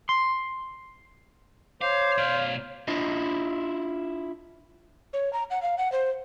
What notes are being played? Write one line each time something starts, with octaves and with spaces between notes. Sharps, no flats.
C6
C5 C#5 F5 D6
B2 D5 F5
D4 E4 F4 D#5
C#5
A#5
F#5
F5
F#5
C5